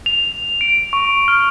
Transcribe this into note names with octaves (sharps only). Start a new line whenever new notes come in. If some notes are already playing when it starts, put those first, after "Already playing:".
F7
D7
C#6
F6